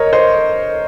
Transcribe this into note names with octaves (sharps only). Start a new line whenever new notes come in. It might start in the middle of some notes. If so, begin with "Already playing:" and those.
Already playing: A#4 C#5 D#5
C5 D#5